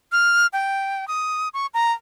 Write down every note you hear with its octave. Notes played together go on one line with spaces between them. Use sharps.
F6
G5
D#6
C#6
A#5